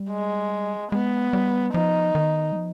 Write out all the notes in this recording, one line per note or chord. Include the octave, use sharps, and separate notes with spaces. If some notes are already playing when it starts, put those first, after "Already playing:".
Already playing: G3
G#3
G#3 B3
G3
F3 D#4
D#3
G3
F3